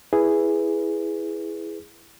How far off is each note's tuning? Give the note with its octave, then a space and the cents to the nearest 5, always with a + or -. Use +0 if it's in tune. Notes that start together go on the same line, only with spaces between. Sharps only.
E4 +0 G#4 +0 B4 +0